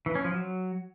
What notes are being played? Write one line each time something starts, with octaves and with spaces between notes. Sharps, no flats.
E3
C#4
F3
F#3